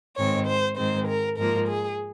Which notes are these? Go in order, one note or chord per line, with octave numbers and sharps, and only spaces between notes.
G#2 D#3 G#3 C4 C#5
C5
G#2 D#3 G#3 C4 C5
A#4
G#2 F3 A#3 A#4
G#4